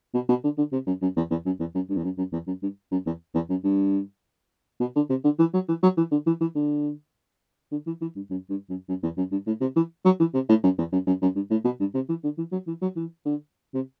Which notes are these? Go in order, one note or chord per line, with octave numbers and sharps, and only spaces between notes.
B2
B2
D3
D3
C3
F#2
F#2
E2
E2
F#2
E2
F#2
G2
E2
F#2
F#2
E2
F#2
G2
F#2
E2
E2
F#2
G2
B2
D3
C3
D3
E3
F#3
E3
F#3
E3
D3
E3
E3
D3
D3
E3
E3
G2
F#2
G2
F#2
F#2
E2
F#2
G2
A2
C3
E3
F#3
E3
C3
A2
F#2
E2
F#2
F#2
F#2
G2
A2
B2
G2
C3
E3
D3
E3
F#3
E3
F#3
E3
D3
C3